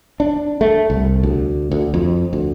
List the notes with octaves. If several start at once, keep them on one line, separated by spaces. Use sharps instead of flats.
D4
A3
C2
D2
D2
F2
D2